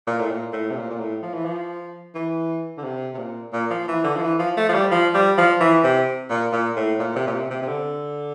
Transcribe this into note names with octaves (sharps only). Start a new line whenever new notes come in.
A#2
A2
A#2
A2
C3
A#2
A#2
A2
F3
E3
F3
E3
D3
C3
C3
A#2
A#2
F3
E3
D3
F3
E3
F3
A3
F3
G3
F3
G3
F3
E3
C3
A#2
A#2
A2
A#2
C3
A#2
C3
C3
C3
D3